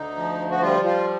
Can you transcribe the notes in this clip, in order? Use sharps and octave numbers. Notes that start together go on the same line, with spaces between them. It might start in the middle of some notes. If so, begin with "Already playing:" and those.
Already playing: D2 D#4
F3
F#4
G3 F4
F4